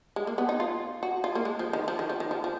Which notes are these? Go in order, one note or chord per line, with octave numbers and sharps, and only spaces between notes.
G#3
A#3
B3
D#4
F4
F#4
F4
A#3
G#3
F3
D#3
F3
D#3
F3
D#3
F3
F3